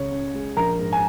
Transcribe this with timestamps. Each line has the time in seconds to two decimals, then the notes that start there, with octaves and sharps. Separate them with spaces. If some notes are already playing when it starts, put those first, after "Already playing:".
Already playing: C#2 C#3 C#5
0.12 C#4
0.34 G#3
0.56 A#1 A#4 A#5
0.79 G#2
0.93 G#5